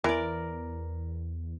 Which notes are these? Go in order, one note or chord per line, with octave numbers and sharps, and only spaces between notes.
E2 E3 A#4 D5